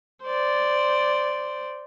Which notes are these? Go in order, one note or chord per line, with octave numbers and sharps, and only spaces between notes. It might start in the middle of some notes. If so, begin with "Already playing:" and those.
C5 D5